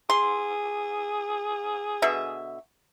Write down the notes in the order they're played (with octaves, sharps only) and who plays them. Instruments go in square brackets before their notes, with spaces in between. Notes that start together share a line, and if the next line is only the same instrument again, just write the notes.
[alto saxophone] G#4 [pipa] C6
[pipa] B2 D3 E5